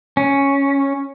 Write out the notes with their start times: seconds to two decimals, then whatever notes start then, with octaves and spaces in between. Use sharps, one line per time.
0.17 C#4